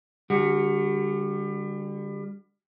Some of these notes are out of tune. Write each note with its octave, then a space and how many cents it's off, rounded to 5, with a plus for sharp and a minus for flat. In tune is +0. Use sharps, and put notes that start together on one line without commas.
D3 +0 G3 +30 F#4 +0